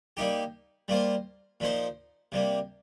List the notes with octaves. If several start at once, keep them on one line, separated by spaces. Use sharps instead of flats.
G3 A#3 D#4 G4
G3 A#3 F4 C5
A#2 F3 D#4 C5
C3 G3 A#3